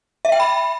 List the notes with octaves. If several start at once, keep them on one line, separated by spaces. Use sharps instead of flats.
E5
G5
B5